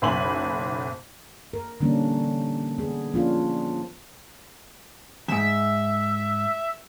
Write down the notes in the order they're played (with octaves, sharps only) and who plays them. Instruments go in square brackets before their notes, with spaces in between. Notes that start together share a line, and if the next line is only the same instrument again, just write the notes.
[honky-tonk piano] F#1 B1 G#5 B5 C6 F#7
[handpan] A#4
D3 E3 G3 A#3 C#4 D4
B3 G#4
F3 A#3 C#4 D4 F4
[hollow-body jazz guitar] E2 G#2 [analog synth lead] E5